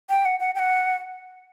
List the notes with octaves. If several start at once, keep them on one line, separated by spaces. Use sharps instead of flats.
G5
F#5
F#5
G5
F#5